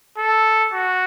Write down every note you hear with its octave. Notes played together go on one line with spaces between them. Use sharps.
A4
F#4